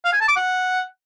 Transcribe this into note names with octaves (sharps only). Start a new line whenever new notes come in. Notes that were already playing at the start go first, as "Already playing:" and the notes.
F5
G#5
A5
D6
F#5